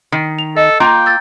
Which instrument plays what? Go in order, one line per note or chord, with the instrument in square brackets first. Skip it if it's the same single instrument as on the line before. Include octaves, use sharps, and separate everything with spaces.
[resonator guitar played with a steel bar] D#3
[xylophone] F7
[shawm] A4 [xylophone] D#5
[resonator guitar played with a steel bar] A#3 F4 A#5 [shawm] G5
[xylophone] E6 A6